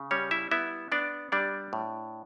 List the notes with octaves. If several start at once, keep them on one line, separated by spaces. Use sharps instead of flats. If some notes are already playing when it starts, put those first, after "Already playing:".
Already playing: C#3
G3 C#4 C#5
E4 E5
B3 E4 E5
B3 D4 D5
G3 D4 D5
A2